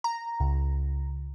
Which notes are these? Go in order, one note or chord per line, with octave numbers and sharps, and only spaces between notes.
A#5
C#2